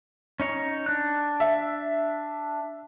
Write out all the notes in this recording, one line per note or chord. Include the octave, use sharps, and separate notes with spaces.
C#4 D#4 C#5
D4 F#6
E5